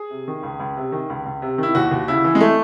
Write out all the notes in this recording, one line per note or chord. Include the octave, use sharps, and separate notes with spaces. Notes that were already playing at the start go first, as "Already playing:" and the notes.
Already playing: G#4
C3
D#3
C#2
C#2
C3
D#3
C#2
C#2
C3
D#3 E4
D#2 F#4
D#2
C#3 E4
E3
G#3
A3